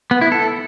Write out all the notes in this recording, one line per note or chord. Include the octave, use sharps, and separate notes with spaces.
B3
E4
A4